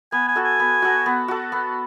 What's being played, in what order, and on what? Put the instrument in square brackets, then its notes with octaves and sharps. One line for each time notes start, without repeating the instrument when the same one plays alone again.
[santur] B3 [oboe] G#5
[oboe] G#5
[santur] F#4 A4
[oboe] G#5
[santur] B3
F#4 A4
B3
F#4 A4
B3